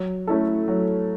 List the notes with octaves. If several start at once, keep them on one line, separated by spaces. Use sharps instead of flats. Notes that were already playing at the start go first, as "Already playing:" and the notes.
Already playing: F#3
A3 C#4 E4 A4
F#3